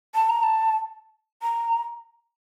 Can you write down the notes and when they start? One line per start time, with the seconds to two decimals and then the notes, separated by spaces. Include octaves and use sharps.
0.15 A5
0.29 A#5
0.43 A5
1.43 A#5